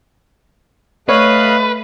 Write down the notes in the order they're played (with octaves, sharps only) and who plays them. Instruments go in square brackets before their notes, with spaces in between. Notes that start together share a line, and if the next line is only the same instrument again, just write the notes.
[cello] A3 [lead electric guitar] B4 [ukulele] C#5 [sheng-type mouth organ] D#5 F5 F#6